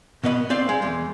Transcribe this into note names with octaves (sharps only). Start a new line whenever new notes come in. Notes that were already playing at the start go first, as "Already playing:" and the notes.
B2 B3 D#5 E5 B5
C4 D5 F5 G5
G#3
E2 G#3